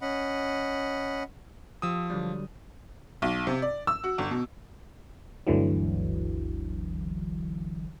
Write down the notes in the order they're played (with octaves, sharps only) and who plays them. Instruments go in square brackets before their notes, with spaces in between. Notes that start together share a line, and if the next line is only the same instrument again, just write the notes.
[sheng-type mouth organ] C#4 D#5 F#5 B5
[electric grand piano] F3 D#6 [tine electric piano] G4 E6
[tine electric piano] D3 F#3 G3
[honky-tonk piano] B1
C3
D5
E6
F#4
G1
B2
[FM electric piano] G1 D2 D3 E3 F#3